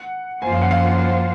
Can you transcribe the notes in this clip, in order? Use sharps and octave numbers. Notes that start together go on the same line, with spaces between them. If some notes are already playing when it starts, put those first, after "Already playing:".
Already playing: F#5
F#2 F3 A#3 F4 C5 G#5
F5
F#5
F5